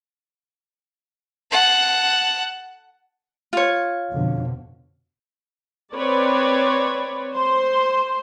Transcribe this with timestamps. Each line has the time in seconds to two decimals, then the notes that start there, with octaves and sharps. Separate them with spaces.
1.51 F#5 A5
3.53 F4 C#5
4.12 F2 B2 D3
5.94 C4 B4 C#5 D5
7.32 C5 C6